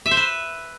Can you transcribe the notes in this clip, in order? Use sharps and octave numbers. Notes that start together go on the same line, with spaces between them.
E5
C5
B4